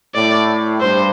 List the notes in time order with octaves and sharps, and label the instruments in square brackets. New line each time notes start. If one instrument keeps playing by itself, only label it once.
[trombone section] A2 [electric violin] D5
[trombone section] G2 [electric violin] C5